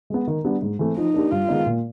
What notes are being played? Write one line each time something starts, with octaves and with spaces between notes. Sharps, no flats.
G#3 B3
D#3
G3 B3 D4
G#2
E3 A3 C4
F3 D#4
A#3 D4 G4
G2 F4
D#3 G#3 B3 D#4
A#2